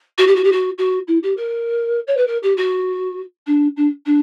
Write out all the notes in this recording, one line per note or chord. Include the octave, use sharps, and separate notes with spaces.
F#4
G4
F#4
G4
F#4
F#4
E4
G4
A#4
C#5
B4
A#4
G4
F#4
D4
D4
D4